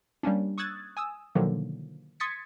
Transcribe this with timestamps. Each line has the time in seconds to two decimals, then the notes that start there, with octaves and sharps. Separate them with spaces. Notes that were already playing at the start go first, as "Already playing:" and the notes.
0.23 G3 A#3 C#4 D4
0.58 C#6 D#6 E6 F#6 G#6 A6
0.97 G#5 D#6 E6
1.35 B2 D3 D#3 F3 F#3 A#3
2.20 C6 D#6 G#6 A6 B6 C#7